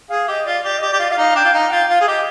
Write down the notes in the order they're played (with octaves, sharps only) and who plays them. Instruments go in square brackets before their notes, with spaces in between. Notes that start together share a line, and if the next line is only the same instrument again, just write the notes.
[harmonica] G#4 [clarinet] F5
[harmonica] G4 [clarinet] D#5
[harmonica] F4 [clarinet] D5
[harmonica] G4 [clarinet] D5
[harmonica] G4 [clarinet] D#5
[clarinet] D5
[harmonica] G4
F4
[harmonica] F4 [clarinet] F5
[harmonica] D#4
[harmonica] D4 [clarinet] G5
[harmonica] F4
[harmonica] D#4 [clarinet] F5
[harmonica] F4 [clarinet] G5
[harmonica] F4 [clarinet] F5
[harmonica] G#4
[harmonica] G4 [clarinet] D#5